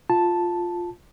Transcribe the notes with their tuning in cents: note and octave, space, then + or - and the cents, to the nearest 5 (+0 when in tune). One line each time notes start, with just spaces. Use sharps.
F4 +5 A5 +0